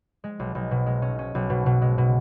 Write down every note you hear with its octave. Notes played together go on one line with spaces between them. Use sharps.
G#3
B1
B1
B2
G#3
C#4
C#4
B1
B2
B2
G#3
B2